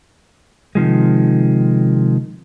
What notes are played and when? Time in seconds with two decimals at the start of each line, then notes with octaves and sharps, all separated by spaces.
0.75 C3 D#3 F3 G#3